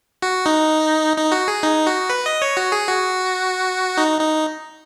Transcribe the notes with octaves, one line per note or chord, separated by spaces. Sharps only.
F#4
D#4
D#4
F#4
G#4
D#4
F#4
B4
D#5
C#5
F#4
G#4
F#4
D#4
D#4